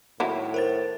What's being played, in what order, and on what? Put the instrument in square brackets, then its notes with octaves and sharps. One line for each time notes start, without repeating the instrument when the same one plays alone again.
[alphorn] A2 [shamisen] D#3 F#3 E4
[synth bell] A#4 C5 A6